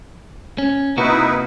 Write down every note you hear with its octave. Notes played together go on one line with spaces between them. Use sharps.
C#4
C3 A#3 D#4 E4 F#4 B4